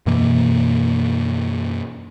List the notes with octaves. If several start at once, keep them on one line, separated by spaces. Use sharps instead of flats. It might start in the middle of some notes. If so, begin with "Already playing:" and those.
F#2 B2 E3 A#3